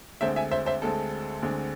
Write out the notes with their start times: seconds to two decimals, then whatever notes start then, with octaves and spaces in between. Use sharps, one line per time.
0.21 D2 D3 G#3 C4 C5 E5
0.36 E5 G#5
0.51 C5 E5
0.66 C5 E5
0.82 D2 D3 G#3 C4 A4
1.42 D2 D3 G#3 C4